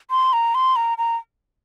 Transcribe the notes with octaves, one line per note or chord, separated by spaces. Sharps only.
C6
A#5
C6
A#5
A#5